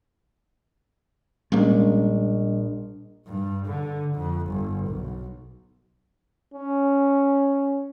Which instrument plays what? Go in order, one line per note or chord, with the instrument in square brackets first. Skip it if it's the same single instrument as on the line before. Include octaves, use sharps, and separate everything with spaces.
[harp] A#1 [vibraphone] G3 D4 D#5 [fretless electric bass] G#3 A#3 C#4
[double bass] G2
D3
F2
G1
B1
[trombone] C#4